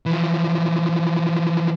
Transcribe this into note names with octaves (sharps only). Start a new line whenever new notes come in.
E3 F3